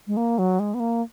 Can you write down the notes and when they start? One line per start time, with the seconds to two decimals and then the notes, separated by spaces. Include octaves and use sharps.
0.07 G#3
0.17 A#3
0.38 F#3
0.59 G#3
0.74 B3
0.80 A#3